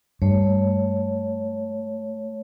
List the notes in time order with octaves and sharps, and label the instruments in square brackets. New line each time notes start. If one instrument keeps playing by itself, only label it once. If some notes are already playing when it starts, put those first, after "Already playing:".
[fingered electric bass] G2 [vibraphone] A3 C#5